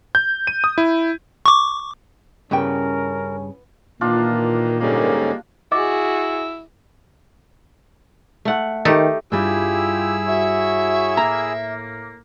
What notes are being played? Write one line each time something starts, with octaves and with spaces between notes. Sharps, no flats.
G6
D#7
D#6
E4
C#6 D6
G2 C#3 B3 C#4 E4 A#4 G5
A#2 D#3 E3 A#3 D4 F4
G#2 D3 G3 G#3 A#3 C#4
E4 F#4 G#4 D#5 D6
A3 F#5
D#3 A3 D#4 G4
G2 G3 E4 F4 G4 G#4 E6
F#4 C#5 E5
A2 A#3 A#5